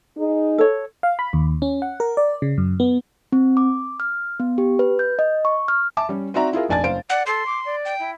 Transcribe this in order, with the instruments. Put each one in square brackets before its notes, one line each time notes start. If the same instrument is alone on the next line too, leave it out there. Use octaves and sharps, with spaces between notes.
[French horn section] D#4 G#4
[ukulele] A4 C#5
[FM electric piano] F5
B5
D#2
C#4
F#5
A#4
D5
C#3
F#2
B3
[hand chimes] C4
D6
F6
B3
G4
B4
G6
D#5
C#6
F6
[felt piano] E5 A5 D6
G3 C#4
C4 D#4 F#4 D5 E5 A#5
E4 F4 G#4 A#4
F1 A#1 D5 G#5 A5 A6
F#1 C5 F5 D7
[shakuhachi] D5 [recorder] F#5
[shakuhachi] A4 [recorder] C6
[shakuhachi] D6
D5
[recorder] G5
[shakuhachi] E4